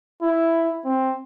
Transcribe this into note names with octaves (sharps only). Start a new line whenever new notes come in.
E4
C4